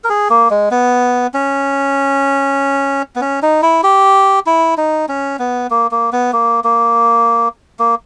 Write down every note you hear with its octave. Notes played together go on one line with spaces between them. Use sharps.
A#4
G#4
A#3
G#3
B3
C#4
B3
C#4
D#4
E4
G4
E4
D#4
C#4
B3
A#3
A#3
B3
A#3
A#3
A#3